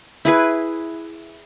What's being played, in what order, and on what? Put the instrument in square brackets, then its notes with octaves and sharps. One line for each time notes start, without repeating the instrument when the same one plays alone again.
[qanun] E4 G#4 B4